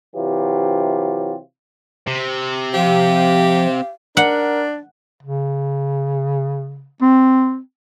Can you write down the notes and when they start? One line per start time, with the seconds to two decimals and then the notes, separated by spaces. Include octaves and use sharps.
0.16 C3 E3 F#3 F4 G4
2.07 C3
2.74 F3 G4 F5
4.17 D4 A#4 F#5
5.23 C#3
7.02 C4